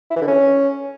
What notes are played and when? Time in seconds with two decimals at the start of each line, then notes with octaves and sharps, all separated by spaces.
0.10 E4
0.16 E3
0.22 D3
0.28 C#4